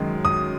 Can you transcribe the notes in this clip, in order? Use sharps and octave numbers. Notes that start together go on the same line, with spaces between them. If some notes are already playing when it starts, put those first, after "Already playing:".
Already playing: F#2 D#3 G#3
D#6